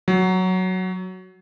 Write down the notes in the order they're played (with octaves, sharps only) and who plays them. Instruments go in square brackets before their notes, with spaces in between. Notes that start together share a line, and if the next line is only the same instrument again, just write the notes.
[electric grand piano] F#3